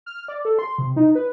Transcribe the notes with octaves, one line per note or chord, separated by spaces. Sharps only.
F6
D5
A4
C6
C3
D#4
B4